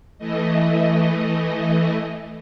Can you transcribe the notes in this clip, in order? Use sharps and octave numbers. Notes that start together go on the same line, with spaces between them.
E3 A3 D#5